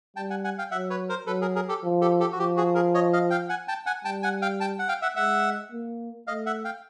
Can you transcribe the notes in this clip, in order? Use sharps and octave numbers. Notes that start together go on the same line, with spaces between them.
G3 G5 A5
F#5 G#5
F#5 G#5
F5 G5
F#3 E5 F#5
B4 C#5
A#4 C5
F#3 A4 B4
G#4 A#4
G#4 A#4
G4 A4
F3
G4 A4
G4 A4
F#4
F3 G4
F#4 G#4
G#4 A#4
C#5 D#5
D#5 F5
F5 G5
F#5 G#5
G5 A5
F#5 G#5
G3 G5 A5
F#5 G#5
F5 G5
G5 A5
F#5
F5 G5
E5 F#5
G#3 E5 F#5
A#3
A3 D#5 F5
E5 F#5
F5 G5